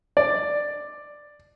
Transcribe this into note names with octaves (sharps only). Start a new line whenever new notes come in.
D5